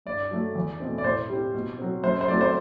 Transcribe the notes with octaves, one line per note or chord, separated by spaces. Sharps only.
G2 D5
F#3 A3
E2
B2 A3 C4
D5
A2 C5
G3 C4
B2
F#3 C4
F#2 C5
C5
F#3 A3 C4 D5
C5